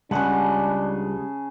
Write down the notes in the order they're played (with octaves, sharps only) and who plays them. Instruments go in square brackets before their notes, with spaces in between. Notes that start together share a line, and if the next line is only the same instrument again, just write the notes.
[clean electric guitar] C#2 [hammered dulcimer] C#3 G#4 A5 [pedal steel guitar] G3 G#3 F#5 [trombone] D4